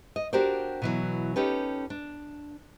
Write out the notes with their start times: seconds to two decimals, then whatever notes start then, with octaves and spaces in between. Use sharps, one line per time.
0.16 D#5
0.33 D4 F#4 G4 A#4 C5 D5
0.82 B2 E3 F#3
1.36 C#4 D#4 G4 A4 B4
1.90 D4